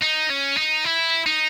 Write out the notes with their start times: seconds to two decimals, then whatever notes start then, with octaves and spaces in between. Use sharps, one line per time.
0.03 D#4
0.30 C#4
0.57 D#4
0.85 E4
1.26 D#4